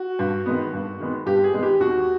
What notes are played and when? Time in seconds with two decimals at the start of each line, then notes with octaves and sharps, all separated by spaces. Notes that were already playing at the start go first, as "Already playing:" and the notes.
Already playing: F#4
0.19 G2
0.46 D#3 G#3 B3
0.73 G2
1.00 D#3 G#3 B3
1.26 G2 G4
1.44 G#4
1.53 D#3 G#3 B3
1.63 G4
1.80 D#2 F#4